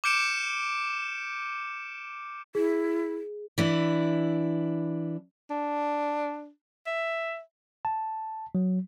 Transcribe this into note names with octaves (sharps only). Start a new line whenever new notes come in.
D6 F6 G6 C#7 D7 E7
E4 G#4
E3 D4 E4
D4
E5
A5
F#3